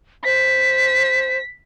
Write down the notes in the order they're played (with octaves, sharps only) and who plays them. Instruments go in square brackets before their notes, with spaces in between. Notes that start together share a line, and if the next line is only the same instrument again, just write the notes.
[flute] C5 [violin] B6